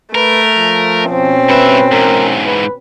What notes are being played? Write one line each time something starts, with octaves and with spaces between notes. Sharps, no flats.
A3 A#4 B4
F3
B2 C4 C#4
G2 B4 E5
G#2 E3 A#4
B4